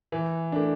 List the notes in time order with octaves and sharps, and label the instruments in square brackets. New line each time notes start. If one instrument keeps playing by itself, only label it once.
[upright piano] E3
A3 D4